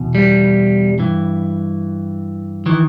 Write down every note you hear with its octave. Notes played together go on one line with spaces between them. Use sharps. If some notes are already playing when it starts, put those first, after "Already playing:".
Already playing: E2 B2
G3
G2 E3
D#3 E3